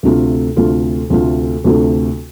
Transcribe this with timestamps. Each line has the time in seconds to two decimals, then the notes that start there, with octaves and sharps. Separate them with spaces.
0.03 D2 C3 A3 F4
0.56 D2 C3 A3 F4
1.10 D2 C3 A3 F4
1.64 D2 C3 A3 F4